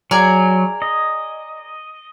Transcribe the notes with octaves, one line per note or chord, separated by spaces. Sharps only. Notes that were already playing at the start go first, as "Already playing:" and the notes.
F#3 G#4 A#4 D5
D#5